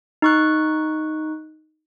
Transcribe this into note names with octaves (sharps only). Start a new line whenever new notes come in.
D#4 C#6 F#6